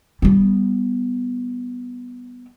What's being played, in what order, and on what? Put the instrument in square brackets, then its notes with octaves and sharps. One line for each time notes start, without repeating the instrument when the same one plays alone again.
[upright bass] G3 B3